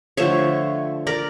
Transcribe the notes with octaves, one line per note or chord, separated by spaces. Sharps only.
D3 F3 A3 C#5 E5
A#4 D5